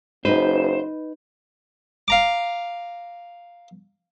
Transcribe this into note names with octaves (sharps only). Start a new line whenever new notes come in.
F#1 D#4 B4 C5
F5 A#5 D6